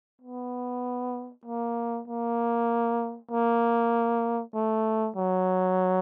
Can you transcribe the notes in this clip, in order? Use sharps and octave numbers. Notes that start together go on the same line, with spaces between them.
B3
A#3
A#3
A#3
A3
F#3